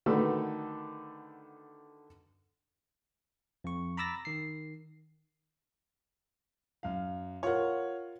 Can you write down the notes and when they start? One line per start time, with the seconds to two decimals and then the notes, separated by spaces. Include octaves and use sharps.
0.06 D3 D#3 A3 F#4 A4 B4
3.64 F2 C#6
3.97 A#5 B5 D6 E6 A6 A#6
4.25 D#3 C7
6.83 F#2 F5
7.43 F4 A#4 C#5 F#5